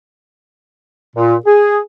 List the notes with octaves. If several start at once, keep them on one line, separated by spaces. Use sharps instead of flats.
A#2
G#4